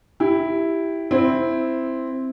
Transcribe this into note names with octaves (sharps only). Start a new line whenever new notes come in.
E4 G4
C4 E4